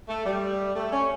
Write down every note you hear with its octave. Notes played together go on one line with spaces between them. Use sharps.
A3
G3
A3
C#4